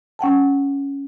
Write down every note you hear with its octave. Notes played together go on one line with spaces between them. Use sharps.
C#4 F#5 G5 A5